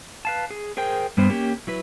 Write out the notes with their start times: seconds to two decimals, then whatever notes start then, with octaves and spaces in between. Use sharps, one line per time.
0.25 B4 F5 A5
0.51 G#4
0.77 G#4 A#4 C5 G5
1.17 G2 G3 B3 C5
1.29 A#3 C#4 G4
1.67 F#3 E4 B4